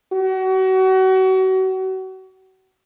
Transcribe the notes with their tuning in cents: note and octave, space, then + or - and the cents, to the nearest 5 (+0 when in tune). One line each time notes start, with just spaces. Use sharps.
F#4 +35